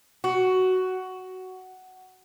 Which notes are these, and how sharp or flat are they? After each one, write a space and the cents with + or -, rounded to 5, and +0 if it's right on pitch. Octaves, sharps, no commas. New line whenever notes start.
F#4 +10